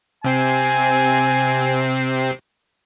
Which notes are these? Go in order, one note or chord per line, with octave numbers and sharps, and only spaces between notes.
C3 C4 G#5 C7